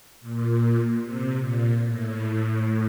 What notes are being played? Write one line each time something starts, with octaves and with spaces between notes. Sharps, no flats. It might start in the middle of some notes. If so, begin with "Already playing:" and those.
A#2
C3
A#2
A2